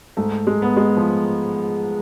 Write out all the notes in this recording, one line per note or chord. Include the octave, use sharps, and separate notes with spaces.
G#2 A3
G#3
B3
G#3
F3